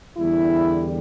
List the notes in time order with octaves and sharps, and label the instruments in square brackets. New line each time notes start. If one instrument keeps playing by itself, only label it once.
[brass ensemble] E2 D3 G3 E4